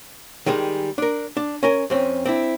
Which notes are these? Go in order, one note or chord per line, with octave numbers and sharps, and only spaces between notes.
D#3 G3 G#3 G#4
D4 A#4
D4
C#4 A#4 G#5
F2 C4 C#4
C4 D4 E4